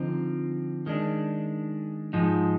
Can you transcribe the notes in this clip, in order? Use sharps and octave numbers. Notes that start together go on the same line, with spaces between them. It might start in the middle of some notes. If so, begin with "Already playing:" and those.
Already playing: D3 F3 C4 D#4
D#3 G#3 D4
G#2 F3 G#3 D#4